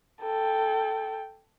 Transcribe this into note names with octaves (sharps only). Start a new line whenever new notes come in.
A4 G5